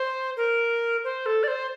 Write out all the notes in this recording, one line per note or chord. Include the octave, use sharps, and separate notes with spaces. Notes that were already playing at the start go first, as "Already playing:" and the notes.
Already playing: C5
A#4
C5
A4
D5
C5